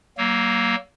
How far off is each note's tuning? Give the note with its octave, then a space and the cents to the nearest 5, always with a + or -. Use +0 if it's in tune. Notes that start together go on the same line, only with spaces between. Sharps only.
F#3 +35 A#3 +0